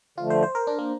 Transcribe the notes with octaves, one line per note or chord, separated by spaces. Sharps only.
D3 F3 A3 F4
C5
C5
A#4
D4
A#3